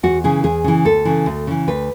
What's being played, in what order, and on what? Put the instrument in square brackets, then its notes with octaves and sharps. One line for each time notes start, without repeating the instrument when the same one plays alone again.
[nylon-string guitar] E2 F#4
C#3 E3 G#4
E2 G#4
C#3 E3
D2 A4
C#3 E3
D2
C#3 E3
D2 B4